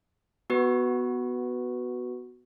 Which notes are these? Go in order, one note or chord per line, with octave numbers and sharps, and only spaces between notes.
B3 F#4 B4